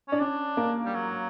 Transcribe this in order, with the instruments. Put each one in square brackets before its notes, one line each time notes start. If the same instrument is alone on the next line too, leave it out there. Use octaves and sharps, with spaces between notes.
[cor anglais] C#4 [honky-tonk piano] D4
[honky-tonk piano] C#4 [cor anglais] D4
[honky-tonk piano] A#3
[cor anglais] G3
F#3